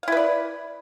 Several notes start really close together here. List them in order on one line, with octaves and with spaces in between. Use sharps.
F5 E4 B4 D5